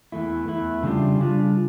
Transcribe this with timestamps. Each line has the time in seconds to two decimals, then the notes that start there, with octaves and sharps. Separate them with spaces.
0.12 E2 E3 A3 E4
0.48 E2 E3 A3 E4
0.83 C#3 G3 D4 F4
1.20 C#3 G3 D4 F4